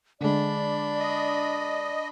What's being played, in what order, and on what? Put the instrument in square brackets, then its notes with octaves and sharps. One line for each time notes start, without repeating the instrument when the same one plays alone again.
[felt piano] D3 G#3 [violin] D4 B5 [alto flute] D5
[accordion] D#5